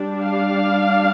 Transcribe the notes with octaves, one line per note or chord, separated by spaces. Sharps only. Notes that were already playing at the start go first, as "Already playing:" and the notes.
Already playing: G3 D4
F5